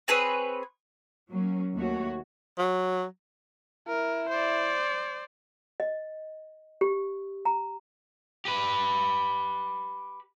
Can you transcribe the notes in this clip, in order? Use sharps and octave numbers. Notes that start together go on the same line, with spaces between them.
C4 G#4 B4 C#5
F#3 A#3 C#4
D#2 A3 F#4 C#5
F#3
E4 A#4
C5 D5
D#5
G4
A#5
G4 B4